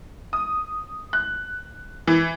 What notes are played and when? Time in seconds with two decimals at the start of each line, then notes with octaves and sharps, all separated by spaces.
0.33 D#6
1.13 F#6
2.07 E3